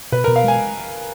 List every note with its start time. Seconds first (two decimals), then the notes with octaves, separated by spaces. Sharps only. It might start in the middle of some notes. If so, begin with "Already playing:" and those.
0.12 B2 B4
0.24 B2 A#4
0.36 F5
0.44 G#3 G#5